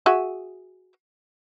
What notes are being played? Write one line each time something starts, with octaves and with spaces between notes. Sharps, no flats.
F#4 G#4 E5